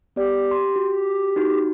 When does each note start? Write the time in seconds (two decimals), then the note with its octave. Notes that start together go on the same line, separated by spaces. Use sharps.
0.16 B3 G4 D5
0.51 C6
0.76 F#4
1.36 D#4 F#4